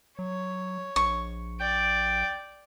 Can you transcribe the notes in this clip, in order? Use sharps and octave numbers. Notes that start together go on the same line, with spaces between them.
F#3 C#5
A#1 C#6
D5 G5